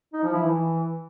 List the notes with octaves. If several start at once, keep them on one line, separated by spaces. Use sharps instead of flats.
D#4
F3
E4
E3